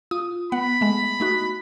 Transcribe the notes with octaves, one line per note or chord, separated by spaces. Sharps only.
F4 D#6
B3 F#5 B5
G#3 A3
A3 D#4 F#4